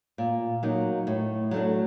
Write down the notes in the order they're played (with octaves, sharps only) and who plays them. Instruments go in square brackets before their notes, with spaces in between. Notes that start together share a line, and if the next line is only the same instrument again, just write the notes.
[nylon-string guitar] A#2
F#3 A#3 D#4
A2
F#3 A3 D4